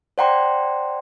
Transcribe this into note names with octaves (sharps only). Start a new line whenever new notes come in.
C5 D5 F#5 G5 A#5 C6